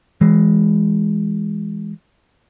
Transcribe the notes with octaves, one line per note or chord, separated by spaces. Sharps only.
E3 G#3